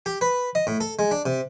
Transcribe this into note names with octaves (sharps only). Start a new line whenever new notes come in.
G4
B4
D#5
A2
A4
G#3
D4
C3